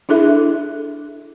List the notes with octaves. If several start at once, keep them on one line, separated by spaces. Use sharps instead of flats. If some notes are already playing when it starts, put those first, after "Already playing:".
D4 E4 G#4 A4 E5